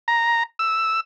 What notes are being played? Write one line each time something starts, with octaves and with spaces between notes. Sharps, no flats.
A#5
E6